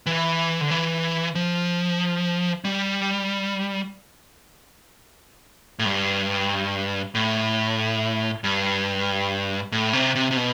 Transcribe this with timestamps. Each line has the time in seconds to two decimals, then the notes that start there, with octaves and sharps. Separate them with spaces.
0.06 E3
0.61 D3
0.70 E3
1.35 F3
2.65 G3
5.79 A2
5.85 G2
7.15 A2
8.44 G2
9.72 A2
9.93 C3
10.15 C3
10.31 C3
10.36 B2